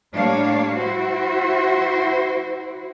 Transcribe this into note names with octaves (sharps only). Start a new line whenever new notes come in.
A2 G3 A#3 D4 C#5 F5
E4 F#4 C5